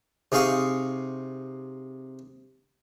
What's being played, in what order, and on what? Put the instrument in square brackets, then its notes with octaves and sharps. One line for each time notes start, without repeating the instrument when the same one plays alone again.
[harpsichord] C3 D#4 G#4 F5 C#6 D#6